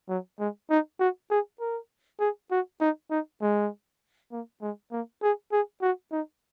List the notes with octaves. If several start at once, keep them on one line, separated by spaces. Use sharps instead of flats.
F#3
G#3
D#4
F#4
G#4
A#4
G#4
F#4
D#4
D#4
G#3
A#3
G#3
A#3
G#4
G#4
F#4
D#4